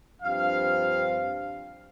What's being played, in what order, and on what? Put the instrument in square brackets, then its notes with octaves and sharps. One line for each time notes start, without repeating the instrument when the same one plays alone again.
[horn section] G2 F3 C4 F5